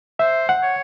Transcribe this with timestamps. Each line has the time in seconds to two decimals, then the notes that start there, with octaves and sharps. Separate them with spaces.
0.19 C5 E5
0.49 F#5
0.63 C#5